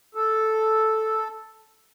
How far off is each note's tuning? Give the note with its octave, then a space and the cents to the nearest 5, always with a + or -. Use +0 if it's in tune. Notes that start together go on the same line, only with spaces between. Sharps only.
A4 -5